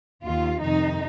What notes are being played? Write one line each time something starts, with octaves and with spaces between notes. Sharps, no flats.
D#2 D#3 F4
F2 C3 D#3 D#4